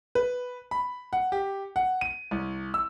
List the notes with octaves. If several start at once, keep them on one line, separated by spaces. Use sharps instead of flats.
B4
B5
F#5
G4
F#5
D#7
C2
E6